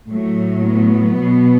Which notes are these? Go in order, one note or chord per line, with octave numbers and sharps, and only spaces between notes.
A2 F#3 A3
B3
B2 F#3